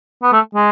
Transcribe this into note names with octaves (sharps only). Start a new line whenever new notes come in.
B3
A3
G#3